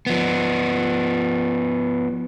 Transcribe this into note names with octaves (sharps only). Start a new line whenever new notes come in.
F3 B3